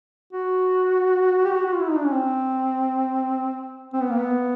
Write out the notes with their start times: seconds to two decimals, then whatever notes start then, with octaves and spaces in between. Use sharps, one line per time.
0.33 F#4
1.45 G4
1.52 F#4
1.66 F#4
1.73 F4
1.81 E4
1.89 D#4
1.97 D4
2.05 C#4
2.12 C4
3.93 C4
4.01 B3
4.10 A#3
4.18 B3